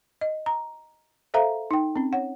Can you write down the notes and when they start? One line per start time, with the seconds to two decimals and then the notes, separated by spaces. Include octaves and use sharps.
0.21 D#5
0.46 A#5
1.34 A4 C5 E5 F5 A#5
1.71 D#4 G5
1.96 C4 C#4
2.13 C#5 F#5